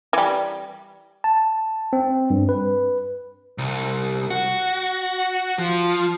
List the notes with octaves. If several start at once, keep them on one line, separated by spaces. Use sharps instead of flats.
E3 G3
A5
C4
G2
B4
C2
F#4
F3